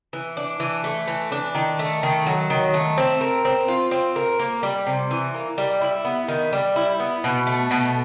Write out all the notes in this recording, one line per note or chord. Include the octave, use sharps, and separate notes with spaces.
E3
D4
E3
A3
E3
D4
D#3
A3
D#3
F#3
D#3
A3
C4
A#4
C4
F4
C4
A#4
A#3
G3
C3
E3
A#3
G3
E4
B3
D#3
G3
E4
B3
B2
A3
B2